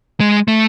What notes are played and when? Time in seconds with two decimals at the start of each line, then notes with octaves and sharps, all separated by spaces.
0.20 G#3
0.48 A3